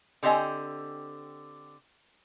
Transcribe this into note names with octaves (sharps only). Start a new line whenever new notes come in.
D3 C4 G4 D#5 G#5